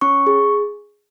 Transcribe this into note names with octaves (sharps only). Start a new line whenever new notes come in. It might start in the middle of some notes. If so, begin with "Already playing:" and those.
C#4 C#6
G#4